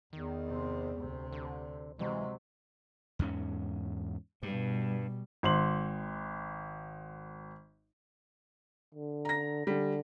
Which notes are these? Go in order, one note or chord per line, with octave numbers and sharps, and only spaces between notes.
E2 D#3
C3 C4
D2 C3
D3
C3 E3 F#3 G#3
E2 G#2 C#4
G2 B2 G3
G#1 C6 F#7
D3
A#5 A#6
D3 G3